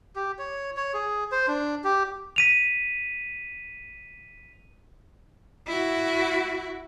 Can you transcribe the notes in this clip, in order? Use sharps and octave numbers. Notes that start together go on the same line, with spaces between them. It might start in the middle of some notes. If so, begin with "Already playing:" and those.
G4
C#5
C#5
G#4
C5
D4
G4
B6 D#7 F7
E4 F#4